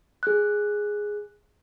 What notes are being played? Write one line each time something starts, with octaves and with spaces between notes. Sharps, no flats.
G#4 F#6